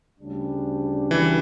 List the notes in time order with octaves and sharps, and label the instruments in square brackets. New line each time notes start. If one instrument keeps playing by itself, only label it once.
[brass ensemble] D2 C#3 G3 D4
[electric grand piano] E3